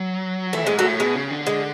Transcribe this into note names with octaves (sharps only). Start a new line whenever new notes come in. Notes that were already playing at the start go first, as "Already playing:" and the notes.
Already playing: F#3
E3 A3
G#2 G#3
F#3 A3
A2
B2 G#3
C#3
D3
G#3